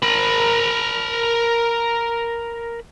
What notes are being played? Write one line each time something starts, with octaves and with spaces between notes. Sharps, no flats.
A#4 B5